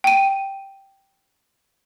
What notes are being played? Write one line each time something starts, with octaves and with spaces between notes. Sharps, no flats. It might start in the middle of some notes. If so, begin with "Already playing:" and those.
G5 D#7